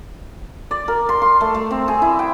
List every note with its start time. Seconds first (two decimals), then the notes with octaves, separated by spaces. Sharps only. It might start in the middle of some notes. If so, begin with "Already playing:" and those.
0.71 D5
0.88 A#4
1.09 C6
1.22 C6
1.41 A3
1.54 A3
1.71 C4
1.88 G#4
2.02 E4
2.19 G5